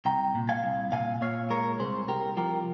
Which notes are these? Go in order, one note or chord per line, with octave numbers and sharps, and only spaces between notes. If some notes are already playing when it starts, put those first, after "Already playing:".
C2 G5 A#5
A#2
F5 G#5
C2
A#2 F5 G#5
A#2 C#5 F5
G#3 A#4 C#5
C2 G#4 C5
C2 G4 A#4
F3 G4 A#4